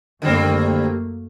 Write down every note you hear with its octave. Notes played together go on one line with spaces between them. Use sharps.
F#2 D3 G3 A3 A#3 C4